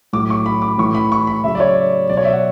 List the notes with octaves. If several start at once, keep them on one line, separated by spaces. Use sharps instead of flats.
A2 F#3 D6
C#6
B5
D6
A2 E3 C#6
B5
C#6
B5
C#3 F#3 E5
D5
C#5
B2 F#3 D5
C#5
E5
F#5